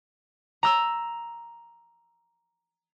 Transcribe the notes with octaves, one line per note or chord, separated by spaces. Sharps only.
A#5 E6